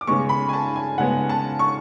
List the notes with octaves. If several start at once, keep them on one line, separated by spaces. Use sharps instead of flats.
D6
C#3 G#3 B3 C#6
B5
G#5
A5
G#5
C#3 G#3 B3 F#5
A5
C#6